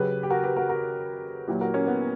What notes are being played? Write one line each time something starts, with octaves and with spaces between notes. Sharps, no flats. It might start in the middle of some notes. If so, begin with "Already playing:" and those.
Already playing: C#3 F#3 G4 B4
G4
F#4 A#4
G4 B4
F#4 A#4
F#4 A#4
A#2 F#3 E4 G4
F#4 A#4
A#3 C#4
B3